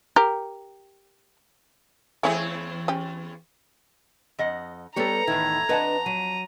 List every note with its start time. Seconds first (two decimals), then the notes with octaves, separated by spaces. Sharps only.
0.16 G4 A#4
2.23 E2 A3 C4 E4 G#4 C#5
2.88 C#4 G4
4.39 F2 D#5 F#5
4.96 G3 B3 G4 A4 C#5 A#5 C#7
5.27 E2 A2 D#3 E5 G#6
5.69 F2 D4 B4 D#5 F#5 A5
6.06 F#3 D#7